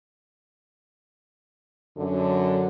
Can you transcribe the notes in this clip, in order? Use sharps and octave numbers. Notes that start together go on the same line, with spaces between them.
F#2 D3